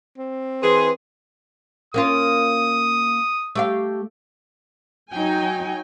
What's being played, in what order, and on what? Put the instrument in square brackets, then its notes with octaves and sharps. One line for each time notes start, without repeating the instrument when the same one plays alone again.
[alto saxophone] C4
[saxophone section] E3 G#4 [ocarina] B4 [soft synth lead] C6
[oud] A#3 C#4 F4 [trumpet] D#6
[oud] A3 G4 F5
[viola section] F#3 G5 G#5 [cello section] D#4